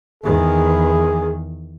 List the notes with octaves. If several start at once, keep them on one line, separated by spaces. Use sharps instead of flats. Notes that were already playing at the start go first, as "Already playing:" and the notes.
E2 D#3 G#4